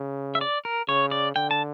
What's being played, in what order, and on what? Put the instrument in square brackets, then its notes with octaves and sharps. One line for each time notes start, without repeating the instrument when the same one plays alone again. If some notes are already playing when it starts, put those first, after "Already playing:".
Already playing: [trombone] C#3
[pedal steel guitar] E5
D5
A#4
[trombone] C#3 [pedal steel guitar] C#5
[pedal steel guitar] D5
[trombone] D3 [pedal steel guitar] G5
[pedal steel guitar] A5